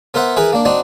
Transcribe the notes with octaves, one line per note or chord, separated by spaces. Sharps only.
B3 A#4 C5 E5 F#5
E3 E4 G#4 A#4 B4
A#3 D4
C4 D4 D#4 F#4